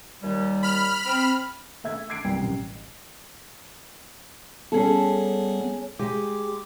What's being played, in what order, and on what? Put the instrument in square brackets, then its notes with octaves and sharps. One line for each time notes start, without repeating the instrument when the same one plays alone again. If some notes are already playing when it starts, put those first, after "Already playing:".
[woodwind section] D#2 G3
[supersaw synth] B5 F6
[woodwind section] C4
[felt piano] A3 E5 G#6
D6 G#6 C7 D7
C2 G3 G5 C7
A1
[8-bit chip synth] G3 B3 [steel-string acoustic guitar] C#4 G#4 A4
[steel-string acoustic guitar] G#3 G4 [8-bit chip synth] D6